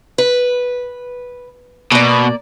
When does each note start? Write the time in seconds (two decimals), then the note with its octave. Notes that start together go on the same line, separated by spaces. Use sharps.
0.18 B4
1.92 B2 A#3 D5